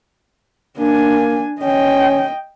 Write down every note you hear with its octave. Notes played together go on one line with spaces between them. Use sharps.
A#3 D4 G#5
C#4 D#5 G5